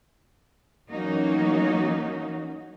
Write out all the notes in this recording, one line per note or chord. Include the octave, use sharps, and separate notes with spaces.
E3 F#3 A#3 C#4 D#4 F#4